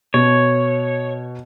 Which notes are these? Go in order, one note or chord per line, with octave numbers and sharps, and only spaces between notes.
B2 C#5